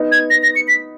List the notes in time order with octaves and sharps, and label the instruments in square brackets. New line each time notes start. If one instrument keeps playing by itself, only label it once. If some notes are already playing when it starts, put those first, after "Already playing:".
Already playing: [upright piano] B3 D#4
[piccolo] G#6
A#6
A#6
C#7
B6